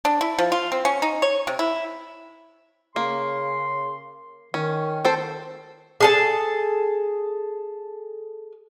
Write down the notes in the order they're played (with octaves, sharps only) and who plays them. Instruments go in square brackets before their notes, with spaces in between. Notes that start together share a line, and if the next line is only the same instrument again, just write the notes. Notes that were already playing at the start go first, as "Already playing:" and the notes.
[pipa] D4
E4
F3
F4
C4
C#4
D#4
C#5
C3
E4
[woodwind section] C#3 C6 [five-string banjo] A#3
[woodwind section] D#3 [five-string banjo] C#4
[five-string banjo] C4 A4 C5
[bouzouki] G#4 A4 A5